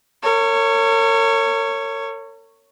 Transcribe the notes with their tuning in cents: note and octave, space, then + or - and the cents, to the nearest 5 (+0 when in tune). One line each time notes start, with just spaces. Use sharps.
A#4 -40 C#5 +0